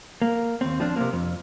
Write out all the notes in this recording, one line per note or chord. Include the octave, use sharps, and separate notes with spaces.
A#3
D#2 C4
F3 C4 D4
C3 A#3
F2